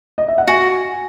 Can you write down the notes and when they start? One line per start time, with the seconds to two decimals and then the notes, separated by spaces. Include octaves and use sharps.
0.18 D#5
0.28 E5
0.38 F#5
0.47 F#4 G#5